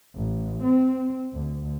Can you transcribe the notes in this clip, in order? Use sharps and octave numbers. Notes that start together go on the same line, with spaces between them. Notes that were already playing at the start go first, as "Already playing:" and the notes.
A1
C4
D2